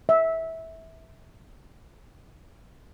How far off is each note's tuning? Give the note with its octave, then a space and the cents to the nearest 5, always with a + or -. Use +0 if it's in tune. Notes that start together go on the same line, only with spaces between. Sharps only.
E5 -20